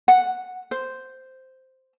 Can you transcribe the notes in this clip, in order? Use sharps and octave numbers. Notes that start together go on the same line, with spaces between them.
F#5
C5